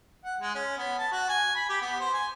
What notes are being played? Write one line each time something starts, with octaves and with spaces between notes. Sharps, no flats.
F#5
G#3
C#4
B3
A5
F#4
G#5
B5
G4
B3
C5
G#5